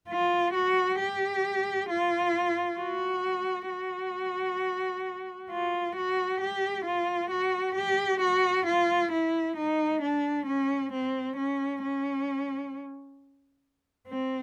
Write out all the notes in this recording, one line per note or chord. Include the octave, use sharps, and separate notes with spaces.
F4
F#4
G4
F4
F#4
F#4
F4
F#4
G4
F4
F#4
G4
F#4
F4
E4
D#4
D4
C#4
C4
C#4
C#4
C4